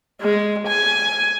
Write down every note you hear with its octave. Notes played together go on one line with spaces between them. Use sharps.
G#3
G#5